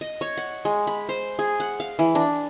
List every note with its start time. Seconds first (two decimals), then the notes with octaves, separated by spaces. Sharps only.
0.01 D#5
0.21 C#5
0.38 F#5
0.65 G#3
0.87 B5
1.09 C5
1.39 G#4
1.60 F#5
1.80 F5
1.99 E3
2.15 D4